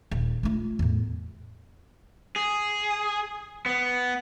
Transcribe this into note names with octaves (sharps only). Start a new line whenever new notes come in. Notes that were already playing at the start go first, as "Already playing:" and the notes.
D#1
A3 F4
E2 A2
G#4
B3